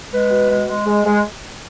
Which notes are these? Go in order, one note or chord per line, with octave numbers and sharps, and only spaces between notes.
G#3 B4
B2
G#3
G#3
G#3
G#3